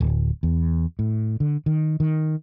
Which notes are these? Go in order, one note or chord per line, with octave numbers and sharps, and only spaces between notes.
D1
E2
A2
D3
D#3
D#3